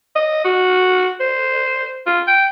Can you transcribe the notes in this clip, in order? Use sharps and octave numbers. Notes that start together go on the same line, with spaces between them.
D#5
F#4
C5
F4
G5